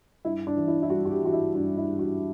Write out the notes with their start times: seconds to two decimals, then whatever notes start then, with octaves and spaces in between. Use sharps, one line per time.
0.25 G2 E4
0.47 D4
0.57 E3 G3
0.68 E4
0.83 E4
0.90 G2 F#4
1.05 F#4
1.11 G4
1.22 E3 G3 F#4
1.33 E4
1.55 G2 D4
1.77 E4
1.87 E3 G3
1.99 F#4